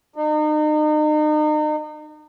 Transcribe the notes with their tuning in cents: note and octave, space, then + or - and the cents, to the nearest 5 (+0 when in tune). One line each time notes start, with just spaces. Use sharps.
D#4 -35